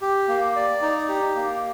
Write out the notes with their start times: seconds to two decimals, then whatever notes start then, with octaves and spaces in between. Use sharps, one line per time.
0.01 G4
0.28 A#3
0.56 D5
0.82 D#4
1.09 G4
1.35 A#3